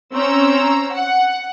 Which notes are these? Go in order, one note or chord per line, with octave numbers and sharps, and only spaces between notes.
C4 C#4 A#5 E6
F#5